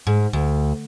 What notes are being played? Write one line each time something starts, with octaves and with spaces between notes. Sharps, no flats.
G#2
D2